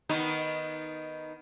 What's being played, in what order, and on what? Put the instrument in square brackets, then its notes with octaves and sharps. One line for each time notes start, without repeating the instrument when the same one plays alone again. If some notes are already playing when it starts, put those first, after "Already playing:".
[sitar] D#3 B3 D#4